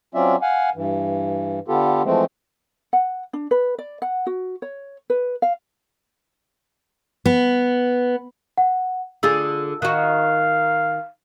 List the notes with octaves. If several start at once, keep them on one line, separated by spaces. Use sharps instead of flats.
F#3 C4 C#4 F4 D5 E5
F5 F#5 G#5
G2 E3
D3 B3 F4 G4 A4
E3 F3 G#3 A3 C4
F#5
D4
B4
D5
F#5
F#4
C#5
B4
F5
B3
F#5
D3 F4 G#4 E6
D#3 F#4 F5 F#6